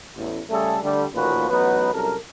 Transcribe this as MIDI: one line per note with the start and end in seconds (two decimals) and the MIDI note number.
0.16 0.41 33
0.16 0.41 40
0.50 0.78 49
0.50 0.78 55
0.50 0.78 57
0.50 0.78 68
0.50 0.78 69
0.83 1.05 50
0.83 1.05 55
0.83 1.05 57
1.14 1.49 33
1.14 1.49 39
1.14 1.49 46
1.14 1.49 53
1.14 1.49 66
1.14 1.49 71
1.50 1.91 33
1.50 1.91 54
1.50 1.91 59
1.50 1.91 63
1.50 1.91 71
1.93 2.16 36
1.93 2.16 42
1.93 2.16 69
1.93 2.16 70